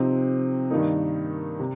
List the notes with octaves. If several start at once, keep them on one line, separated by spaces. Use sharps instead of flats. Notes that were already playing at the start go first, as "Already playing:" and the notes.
Already playing: C3 F3 C4 D#4
G2 D#3 A#3 D#4
C3